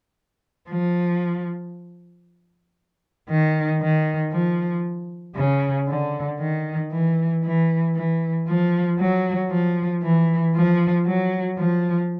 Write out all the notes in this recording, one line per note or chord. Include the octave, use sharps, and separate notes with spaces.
F3
D#3
D#3
F3
C#3
D3
D#3
E3
E3
E3
F3
F#3
F3
E3
F3
F#3
F3